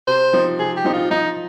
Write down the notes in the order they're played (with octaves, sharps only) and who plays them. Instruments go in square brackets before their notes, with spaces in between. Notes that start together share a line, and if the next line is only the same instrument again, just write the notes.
[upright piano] C3 [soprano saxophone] C5
[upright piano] F3 C4 D#4
[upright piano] C3 [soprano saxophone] G#4
[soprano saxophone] G4
[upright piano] F3 C4 D#4
[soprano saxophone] F4
[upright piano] F3 [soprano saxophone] D#4